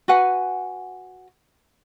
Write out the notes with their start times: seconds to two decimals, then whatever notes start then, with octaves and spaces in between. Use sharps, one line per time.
0.08 F#4 B4 F#5 G#5